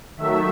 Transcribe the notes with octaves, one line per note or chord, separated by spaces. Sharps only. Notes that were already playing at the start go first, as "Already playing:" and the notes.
D#3 F#3 A3 E5